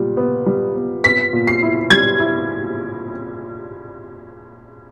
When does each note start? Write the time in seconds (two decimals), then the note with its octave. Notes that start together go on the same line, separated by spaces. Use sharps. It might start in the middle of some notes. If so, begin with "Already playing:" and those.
Already playing: A#2 G3
0.17 B3
0.46 G3
0.75 B3
1.04 B3 B6
1.33 A#2
1.47 C7
1.63 E4
1.90 G3 G#6
2.20 E4